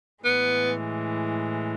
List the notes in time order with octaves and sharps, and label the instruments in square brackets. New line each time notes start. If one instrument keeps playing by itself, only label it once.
[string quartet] A2 E3 G#3 [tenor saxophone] B3